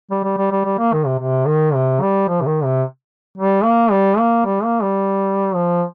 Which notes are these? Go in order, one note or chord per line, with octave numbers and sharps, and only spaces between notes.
G3
G3
G3
G3
G3
A#3
D#3
C3
C3
D#3
C3
G3
F3
C3
D#3
C3
G3
A#3
G3
A#3
G3
A#3
G3
F3